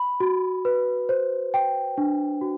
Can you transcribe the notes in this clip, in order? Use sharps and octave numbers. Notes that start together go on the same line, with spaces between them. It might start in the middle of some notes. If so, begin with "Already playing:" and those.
Already playing: B5
F#4
B4
C5
G5
D4
F#4